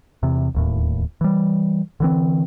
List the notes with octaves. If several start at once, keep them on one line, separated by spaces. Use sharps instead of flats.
E2 C3
D1 D#2 A2
E3 G3
D3 E3 C4